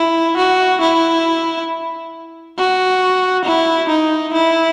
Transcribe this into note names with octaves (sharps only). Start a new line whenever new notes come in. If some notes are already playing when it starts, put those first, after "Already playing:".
Already playing: E4
F#4
E4
F#4
E4
D#4
E4